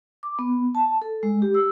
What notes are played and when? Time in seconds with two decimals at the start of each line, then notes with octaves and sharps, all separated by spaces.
0.23 D6
0.39 B3
0.75 A5
1.02 A4
1.23 G#3
1.42 G4
1.54 E6